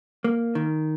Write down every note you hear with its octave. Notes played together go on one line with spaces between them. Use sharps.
A#3
D#3